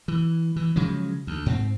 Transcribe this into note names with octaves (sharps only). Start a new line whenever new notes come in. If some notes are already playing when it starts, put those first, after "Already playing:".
E3
E3
C#3 F3 F#3 G#3
D2
G#2 C4